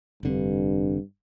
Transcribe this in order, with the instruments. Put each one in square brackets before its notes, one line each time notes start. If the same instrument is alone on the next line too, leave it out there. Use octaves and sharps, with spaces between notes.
[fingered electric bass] F1 D3 C4 [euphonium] G2